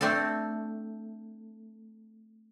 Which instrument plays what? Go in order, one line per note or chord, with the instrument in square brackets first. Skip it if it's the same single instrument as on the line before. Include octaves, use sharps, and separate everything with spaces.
[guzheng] A3 C4 D4 A4